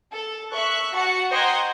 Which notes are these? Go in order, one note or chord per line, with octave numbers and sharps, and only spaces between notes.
A4
E5 C#6 F#6
F#4 F#5 A5 C#7
C5 D#5 F#5 G5 A#5 G#6